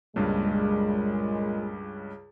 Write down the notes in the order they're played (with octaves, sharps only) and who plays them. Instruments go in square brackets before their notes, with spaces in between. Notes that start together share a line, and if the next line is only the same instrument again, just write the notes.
[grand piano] C#2 G2 [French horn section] A#2 G#3